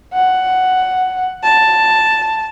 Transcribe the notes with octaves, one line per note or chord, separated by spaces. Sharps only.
F#5
A5